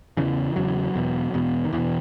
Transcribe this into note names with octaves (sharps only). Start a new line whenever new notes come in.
E2 C#3 E3
E2 C#3 F#3
E2 B2
E2 B2
D#3
E2 B2 E3